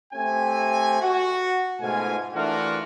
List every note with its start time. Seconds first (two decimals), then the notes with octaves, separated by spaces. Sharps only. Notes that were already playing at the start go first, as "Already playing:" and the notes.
0.13 A3 C4 G4 G#5
1.02 F#4
1.81 G#2 B2 A3 F4 G#5
2.34 E3 A3 D4 F4 F#4 A#4